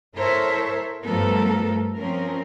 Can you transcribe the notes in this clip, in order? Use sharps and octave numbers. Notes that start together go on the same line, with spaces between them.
E4 A4 A#4 C5 C#5 E5
G2 F3 A3 B3 A4 A#4
F3 C4 C#4 A#4